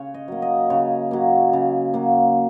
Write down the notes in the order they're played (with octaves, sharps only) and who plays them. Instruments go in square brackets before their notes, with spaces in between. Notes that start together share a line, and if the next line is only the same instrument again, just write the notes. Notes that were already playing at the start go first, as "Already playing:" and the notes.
Already playing: [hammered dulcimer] C#3 C#5
D#5
F#3 A#3
D#5
C#3 C#5
F#3 A#3
C#3
F#3 A#3